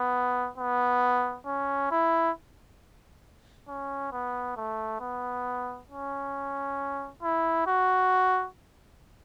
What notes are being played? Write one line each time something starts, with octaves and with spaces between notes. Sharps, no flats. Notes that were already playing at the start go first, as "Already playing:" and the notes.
Already playing: B3
B3
C#4
E4
C#4
B3
A3
B3
C#4
E4
F#4